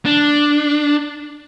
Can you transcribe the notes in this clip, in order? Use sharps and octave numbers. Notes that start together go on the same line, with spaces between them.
D4